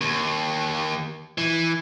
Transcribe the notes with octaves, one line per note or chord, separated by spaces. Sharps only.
D#2
E3